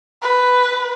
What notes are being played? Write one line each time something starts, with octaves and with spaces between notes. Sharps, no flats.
B4